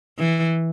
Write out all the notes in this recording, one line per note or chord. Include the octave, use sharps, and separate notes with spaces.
E3